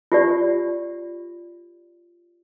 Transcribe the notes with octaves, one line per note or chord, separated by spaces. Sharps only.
F4 G4 D5